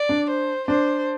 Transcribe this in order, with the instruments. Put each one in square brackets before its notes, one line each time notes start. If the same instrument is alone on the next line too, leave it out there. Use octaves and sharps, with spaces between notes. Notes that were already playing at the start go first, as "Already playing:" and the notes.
Already playing: [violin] D5
[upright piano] D4
[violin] C5
[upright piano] D4 [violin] C5